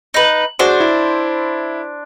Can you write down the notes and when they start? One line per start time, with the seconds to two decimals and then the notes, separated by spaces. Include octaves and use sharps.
0.14 D#4 B4
0.59 D4 F#4 G#4 C5
0.80 E4